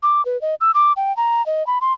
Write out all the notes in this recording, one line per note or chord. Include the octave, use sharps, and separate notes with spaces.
D6
B4
D#5
E6
D6
G5
A#5
D#5
B5
C6